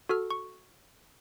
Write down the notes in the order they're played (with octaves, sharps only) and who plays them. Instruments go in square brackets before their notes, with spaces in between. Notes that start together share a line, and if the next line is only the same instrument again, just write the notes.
[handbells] F#4 A4 F6
C#6